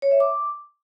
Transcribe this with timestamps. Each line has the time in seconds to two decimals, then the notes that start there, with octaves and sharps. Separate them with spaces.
0.02 C#5
0.11 E5
0.20 D6